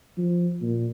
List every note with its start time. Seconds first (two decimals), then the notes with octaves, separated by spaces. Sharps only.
0.18 F3
0.62 A#2